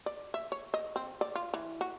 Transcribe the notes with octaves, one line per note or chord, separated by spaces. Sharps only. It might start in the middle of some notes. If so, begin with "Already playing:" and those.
D5
E5
C#5
D#5
C4
D5
F4
E3
F#4